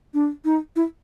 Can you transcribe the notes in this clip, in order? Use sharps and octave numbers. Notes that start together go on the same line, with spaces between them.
D4
D#4
E4